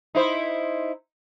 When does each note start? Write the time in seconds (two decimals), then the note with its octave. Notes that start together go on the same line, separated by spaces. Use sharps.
0.15 D#4 E4 C5